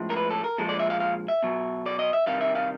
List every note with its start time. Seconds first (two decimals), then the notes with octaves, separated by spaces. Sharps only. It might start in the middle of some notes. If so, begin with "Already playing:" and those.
Already playing: A2 F3 G#3
0.10 A#4
0.16 B4
0.30 A4
0.44 A#4
0.58 A#2 F3 G#3 A4
0.69 D5
0.79 E5
0.90 F5
1.00 F5
1.28 E5
1.43 B2 F#3
1.86 D5
1.99 D#5
2.13 E5
2.26 C3 D#3 G3 F5
2.41 E5
2.55 F5